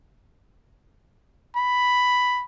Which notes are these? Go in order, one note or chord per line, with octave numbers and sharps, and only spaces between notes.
B5